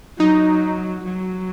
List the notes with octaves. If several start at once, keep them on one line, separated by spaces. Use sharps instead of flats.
F#3 D#4
F#3